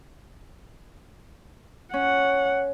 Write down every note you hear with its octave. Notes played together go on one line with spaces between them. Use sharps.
C#4 F#5